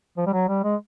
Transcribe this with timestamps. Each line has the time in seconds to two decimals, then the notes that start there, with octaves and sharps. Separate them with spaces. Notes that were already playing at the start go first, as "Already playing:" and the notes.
0.17 F3
0.27 G3
0.33 F#3
0.49 G3
0.64 G#3